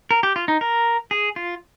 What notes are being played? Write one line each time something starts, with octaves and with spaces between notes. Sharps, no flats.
A#4
G4
F4
D#4
A#4
G#4
F4